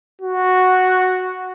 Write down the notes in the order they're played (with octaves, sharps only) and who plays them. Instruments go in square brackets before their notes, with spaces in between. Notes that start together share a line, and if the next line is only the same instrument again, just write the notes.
[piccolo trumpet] F#4